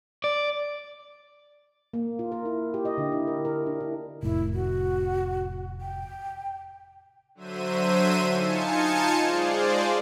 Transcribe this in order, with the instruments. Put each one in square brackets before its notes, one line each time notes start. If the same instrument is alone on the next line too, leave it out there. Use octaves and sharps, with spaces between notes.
[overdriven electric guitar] D5
[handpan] A#3
F4
A#4
E4
G4
D#5
D3
E4
A#4
A#4
D4
E4
[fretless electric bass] F1 A2 [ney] E4
[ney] F#4
G5
[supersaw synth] D3 F#3 C5 E5 D#7
D#4 F4 G#5 A5 C#7
G#3 F4 G#4 C5 D5